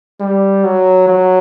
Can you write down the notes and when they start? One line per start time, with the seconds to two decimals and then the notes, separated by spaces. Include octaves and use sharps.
0.20 G3
0.64 F#3
1.08 F#3